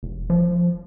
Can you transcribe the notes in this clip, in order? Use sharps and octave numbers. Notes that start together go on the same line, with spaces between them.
F1
F3